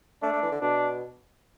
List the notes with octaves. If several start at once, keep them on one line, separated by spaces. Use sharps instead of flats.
A3 D4
A3
E3
D3
B2 D4